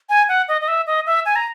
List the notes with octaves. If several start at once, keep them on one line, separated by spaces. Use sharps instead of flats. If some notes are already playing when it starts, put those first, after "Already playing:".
G#5
F#5
D#5
D#5
E5
D#5
E5
G#5
A#5